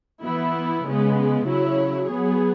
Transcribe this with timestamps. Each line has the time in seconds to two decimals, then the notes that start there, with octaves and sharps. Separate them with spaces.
0.23 E3 B3 E4
0.85 C#3 G#3 B3
1.47 C#3 F#3 E4 C#5
2.09 F#3 B3 G#4